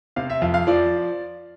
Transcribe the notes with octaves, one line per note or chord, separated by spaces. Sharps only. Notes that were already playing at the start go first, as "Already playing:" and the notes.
C3 F5
E5
F2 F5
F5
F3 D5